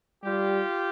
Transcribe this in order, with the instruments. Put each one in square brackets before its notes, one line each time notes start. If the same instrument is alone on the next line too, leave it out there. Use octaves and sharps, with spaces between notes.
[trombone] G3 [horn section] F4 G4